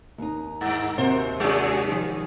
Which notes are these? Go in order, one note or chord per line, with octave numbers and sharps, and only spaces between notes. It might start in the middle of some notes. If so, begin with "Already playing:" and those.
D#2 D#4
G2
D#2 C3 A#3 C4 F#4 C5
G3 C#4 F#4 G#4
D#3 F3